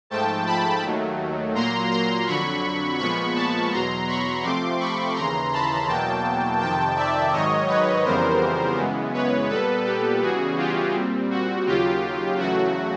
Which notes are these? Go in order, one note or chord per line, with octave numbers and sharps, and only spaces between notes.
G#2 F3 A3 G5 A5
A5 B5
D#2 D#3 F#3 A3
A#2 F#3 A#3 A#5 C6
A#5 C6
F2 D3 F#3 B5 C#6
A#2 F3 G#3 B3 B5 C#6
A5 B5
E2 B2 F#3 A#5 C6
B5 C#6
C3 F3 A3 C4 C6 D6
B5 C#6
D#2 C#3 E3 A#5 C6
A5 B5
E2 B2 F#3 A#3 G5 A5
F2 C3 D#3 G5 A5
D5 E5
G#2 D#3 F#3 C#5 D#5
B4 C#5
F2 C#3 E3 G3 B3 A#4 C5
F#2 C#3 E3 G#3 B3
B4 C#5
A#2 G3 B3 A4 B4
G4 A4
E2 C#3 E3 G3 F#4 G#4
F4 G4
A#2 G3 C4
F#4
D#2 C#3 F#3 F4 G4
E2 C#3 F#3 A3 F#4